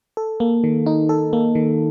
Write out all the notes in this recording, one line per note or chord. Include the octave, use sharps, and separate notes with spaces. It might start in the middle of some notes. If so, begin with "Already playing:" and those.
A4
A#3
D#3
D#4
A4
A#3
D#3